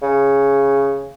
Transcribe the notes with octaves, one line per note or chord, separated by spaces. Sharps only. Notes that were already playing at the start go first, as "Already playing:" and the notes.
C#3